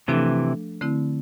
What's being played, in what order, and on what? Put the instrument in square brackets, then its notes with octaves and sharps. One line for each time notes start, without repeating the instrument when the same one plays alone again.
[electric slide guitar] C3 E3 [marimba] F3 A3 D4 A4
[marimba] D3 A3 C4 E4